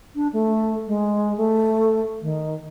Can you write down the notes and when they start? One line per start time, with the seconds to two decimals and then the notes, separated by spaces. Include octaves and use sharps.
0.16 D4
0.33 A3
0.87 G#3
1.37 A3
2.22 D#3